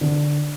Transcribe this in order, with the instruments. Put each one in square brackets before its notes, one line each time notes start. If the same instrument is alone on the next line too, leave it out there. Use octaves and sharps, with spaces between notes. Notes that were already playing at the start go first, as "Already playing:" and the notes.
[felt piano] D3